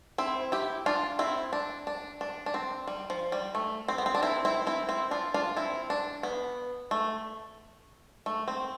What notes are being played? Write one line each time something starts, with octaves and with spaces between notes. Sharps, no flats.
C4 E4
E4 G4
D4 F4
C4 E4
D4
D4
D4
D4
C4
G3
F3
G3
A3
C4
B3
C4
D4
C4 E4
C4 E4
C4 E4
C4 E4
D4 F4
D4 F4
C4 E4
D4
B3
A3
A3
C4